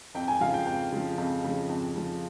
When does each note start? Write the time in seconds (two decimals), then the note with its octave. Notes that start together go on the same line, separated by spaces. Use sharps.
0.15 F2 G5
0.28 G#5
0.40 C#3 F3 F5
0.54 G5
0.66 F2 G5
0.92 C#3 F3
1.18 F2
1.44 C#3 F3
1.69 F2
1.96 C#3 F3